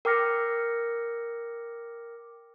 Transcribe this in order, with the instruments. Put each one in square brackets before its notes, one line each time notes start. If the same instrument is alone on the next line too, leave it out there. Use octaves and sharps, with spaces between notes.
[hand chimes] A#4 G5 D6 F6 A#6 C#7